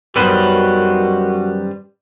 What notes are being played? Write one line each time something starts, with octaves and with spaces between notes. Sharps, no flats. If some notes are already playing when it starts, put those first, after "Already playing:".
F#2 D#3 G3 B3 F#4 B4 C5